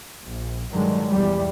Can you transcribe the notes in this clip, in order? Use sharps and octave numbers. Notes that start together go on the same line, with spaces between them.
A#1
G2 D3 D#3 F#3 G#3
B1 E2 E3 G3